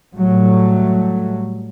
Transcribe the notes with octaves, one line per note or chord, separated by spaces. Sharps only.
A2 F#3 G3 A3